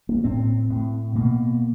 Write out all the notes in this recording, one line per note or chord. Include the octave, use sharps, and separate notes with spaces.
A#3
A2 C4
A2
B2 A#3